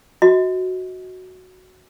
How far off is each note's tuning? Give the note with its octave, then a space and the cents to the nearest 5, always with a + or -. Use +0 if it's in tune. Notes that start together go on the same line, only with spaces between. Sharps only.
F#4 +0 D#5 +35